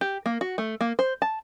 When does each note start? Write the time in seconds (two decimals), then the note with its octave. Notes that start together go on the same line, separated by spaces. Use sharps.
0.01 G4
0.26 A#3
0.41 F#4
0.58 A3
0.81 A#3
0.99 C5
1.22 A5